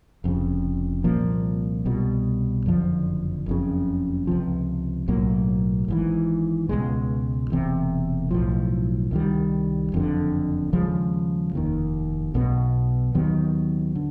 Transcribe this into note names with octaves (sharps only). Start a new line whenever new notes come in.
F1 F2 C#3
C2 A#2 F3 A#3
C2 B2 G3
F#1 F2 D3 F3
F#1 F2 C#3
C#2 C3 F3
B1 A2 F#3 A#3
G#1 G#2 E3
C#2 B2 G#3
E1 E2 C3
B1 A2 F3
C2 C3 D#3 G3
F#1 F2 D3
D#2 C#3 F3 G#3
F1 D#2 D#3
B1 B2 G3 B3
D#2 D#3 F#3 B3
D3